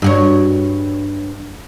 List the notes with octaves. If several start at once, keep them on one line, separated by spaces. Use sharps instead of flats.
G2 F#4 C#5